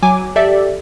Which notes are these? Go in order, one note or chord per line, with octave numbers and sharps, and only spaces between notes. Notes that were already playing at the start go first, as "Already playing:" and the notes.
F#3 G#5 D6
G4 A4 D5 E5